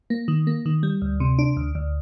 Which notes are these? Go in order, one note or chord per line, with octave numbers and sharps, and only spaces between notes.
A#3
D#3
A#3
D#3
G3
D2
C3
D4
D2
D2